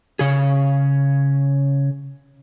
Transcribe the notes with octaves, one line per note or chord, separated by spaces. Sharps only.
C#3 G#4